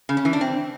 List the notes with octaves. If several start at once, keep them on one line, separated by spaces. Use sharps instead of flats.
C#3
C#4
E3
D4
C4